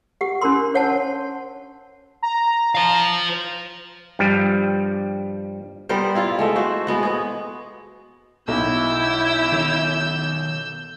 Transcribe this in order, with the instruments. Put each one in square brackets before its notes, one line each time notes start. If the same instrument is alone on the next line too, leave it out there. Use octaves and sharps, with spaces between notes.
[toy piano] G4 F#5
C#4 D4 E4 A#4 B5 C6
C5 C#5 F#5 G#5 A5
[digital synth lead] A#5
[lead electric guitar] C5 F5
[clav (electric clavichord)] G2 F3 G3
[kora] G3 B3 A#4 C5
E4 F4 F5
G#3 A3 E5
F#4 C5
G#3 B3 F#4
B3 G#4
[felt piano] B1 [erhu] E4 [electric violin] E6 G6
[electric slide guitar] D#3 A4 C#5